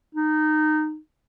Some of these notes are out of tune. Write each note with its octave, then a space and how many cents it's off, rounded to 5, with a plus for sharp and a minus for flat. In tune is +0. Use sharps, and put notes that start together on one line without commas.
D#4 -15